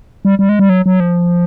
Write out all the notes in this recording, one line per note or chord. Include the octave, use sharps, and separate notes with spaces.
G3
G3
G#3
G3
F#3
F#3
F3